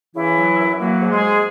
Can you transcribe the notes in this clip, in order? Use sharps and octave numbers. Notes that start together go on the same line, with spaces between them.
C#3 E3 E4
F#3
F#2
F#3 A#3 F#4
G#2
G#3 G#4
G#2